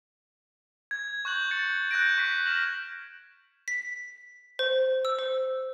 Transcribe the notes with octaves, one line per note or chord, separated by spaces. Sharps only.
G#6
C#6 F#6 G6 F#7
G6 A6 C#7
F#6 G6 A#6 D7
C#6 F#6 B6 D#7
F6 A#6 B6 E7 F#7
B6
C5
E6
C5